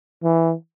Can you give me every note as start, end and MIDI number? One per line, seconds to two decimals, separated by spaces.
0.23 0.54 52